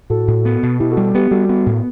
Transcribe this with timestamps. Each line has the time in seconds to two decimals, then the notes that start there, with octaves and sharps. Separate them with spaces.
0.10 A2 F#4 A4
0.28 A2
0.45 B3
0.63 B2
0.79 B2 E4 G4
0.91 F#4 A4
0.97 G3
1.03 F#4 A4
1.14 B3 G4 B4
1.31 G3 F#4 A4
1.49 B3
1.66 A2